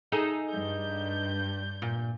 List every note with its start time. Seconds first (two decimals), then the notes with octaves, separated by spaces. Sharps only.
0.12 D#4 G#4 A4
0.49 G2 G6
1.82 A#2